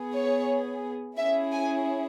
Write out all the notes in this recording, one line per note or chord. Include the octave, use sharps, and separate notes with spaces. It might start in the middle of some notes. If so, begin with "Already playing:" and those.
Already playing: B3 G#4
C#5
C#4 E4 G#4 E5
G#5